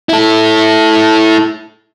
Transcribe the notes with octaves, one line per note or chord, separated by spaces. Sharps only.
E4 A4